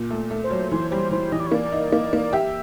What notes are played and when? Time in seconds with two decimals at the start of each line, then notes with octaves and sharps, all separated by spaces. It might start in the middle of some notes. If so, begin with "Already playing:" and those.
Already playing: A#2
0.11 A3
0.31 A3
0.44 C5
0.51 F#3
0.71 E3 C5
0.91 G3 C5
1.11 E3 C5
1.32 E3 D#5
1.40 D5
1.47 C#5
1.52 A#3 D5
1.72 D#4
1.92 A#3
2.13 A#3
2.33 G4 E5